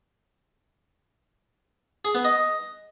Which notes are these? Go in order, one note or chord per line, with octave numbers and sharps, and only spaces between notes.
G#4
B3
D#5